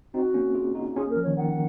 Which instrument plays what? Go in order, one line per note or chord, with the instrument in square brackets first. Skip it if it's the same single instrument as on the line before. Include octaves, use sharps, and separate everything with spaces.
[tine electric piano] C4 D#4 [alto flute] F#4
[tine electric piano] A#3 C#4
F4 G#4
D#4 F#4
[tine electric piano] C#4 F4 [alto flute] G#4
[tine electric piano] A#3 C#4
[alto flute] A#4
[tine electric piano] F3
[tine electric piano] D#3 [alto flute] C#5
[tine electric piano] D#3 [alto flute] F#5